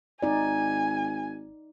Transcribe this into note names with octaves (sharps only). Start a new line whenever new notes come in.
G#1 D#4 D5 G#5